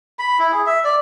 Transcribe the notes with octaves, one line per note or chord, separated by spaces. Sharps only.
B5
E4
G#4
E5
D5